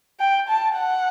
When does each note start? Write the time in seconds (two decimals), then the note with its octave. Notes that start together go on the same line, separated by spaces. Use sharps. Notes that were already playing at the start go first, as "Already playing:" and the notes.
0.20 G5
0.48 A5
0.77 F#5